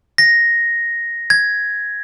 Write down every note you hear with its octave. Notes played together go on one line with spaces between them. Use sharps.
A#6
G#6